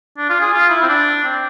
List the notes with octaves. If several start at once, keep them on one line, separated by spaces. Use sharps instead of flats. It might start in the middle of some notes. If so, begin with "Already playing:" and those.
D4
F4
G#4
F4
E4
C4
D4
C4